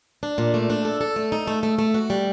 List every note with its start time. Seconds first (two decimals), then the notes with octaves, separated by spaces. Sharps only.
0.23 D4
0.38 A#2
0.54 A3
0.70 D4
0.85 A4
1.01 A4
1.16 A3
1.32 D#4
1.48 A3
1.63 A3
1.79 A3
1.94 F#4
2.10 G3